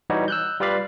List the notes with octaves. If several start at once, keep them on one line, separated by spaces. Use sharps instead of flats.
E3 G3 D#4 F#4 G4 C#5
E6 F#6 G6
G3 F4 B4 D5 F5 B5